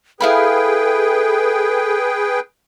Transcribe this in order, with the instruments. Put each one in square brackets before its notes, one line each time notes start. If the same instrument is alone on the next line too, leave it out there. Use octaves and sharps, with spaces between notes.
[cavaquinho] E4 F5 B5 [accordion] G#4 B4 G5 [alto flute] A4